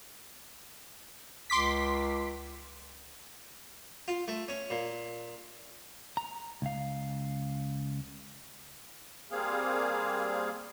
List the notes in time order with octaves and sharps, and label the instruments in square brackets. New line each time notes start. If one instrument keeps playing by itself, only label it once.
[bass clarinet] C#2 [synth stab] C6 D6 B6
[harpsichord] F4
A3
C#4
A#2
[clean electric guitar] A#5
C#2 F5
[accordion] G3 A#3 C4 G#4 F5